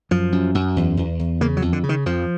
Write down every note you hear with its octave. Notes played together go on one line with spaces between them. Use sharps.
F#2 F3
F#2
F#2
E2
E2
E2
C#3 A#3
F#3
F2
D3
C#3
D#3
F2 F3